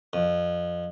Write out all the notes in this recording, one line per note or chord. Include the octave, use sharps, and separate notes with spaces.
F2